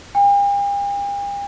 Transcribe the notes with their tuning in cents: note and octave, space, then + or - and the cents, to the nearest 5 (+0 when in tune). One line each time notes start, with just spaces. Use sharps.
G5 +45